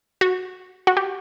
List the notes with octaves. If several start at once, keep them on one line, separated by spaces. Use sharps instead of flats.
F#4
F#4
G4